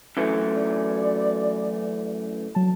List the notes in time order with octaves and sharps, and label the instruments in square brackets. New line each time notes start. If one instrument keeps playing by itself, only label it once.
[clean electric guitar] F#2 E3 A3
[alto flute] D5
[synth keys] F#3 A5